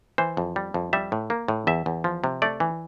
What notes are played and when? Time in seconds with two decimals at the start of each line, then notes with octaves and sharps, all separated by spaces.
0.18 E3 C5
0.37 F2
0.56 G3
0.74 F2
0.93 G3 E5
1.12 A2
1.30 A#3
1.48 A2
1.67 E2 E5
1.86 E2
2.04 F3
2.24 C3
2.42 A3 D5
2.60 E3